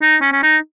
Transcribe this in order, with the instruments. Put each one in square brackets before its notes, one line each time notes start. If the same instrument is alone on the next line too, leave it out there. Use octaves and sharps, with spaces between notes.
[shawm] D#4
C#4
C#4
D#4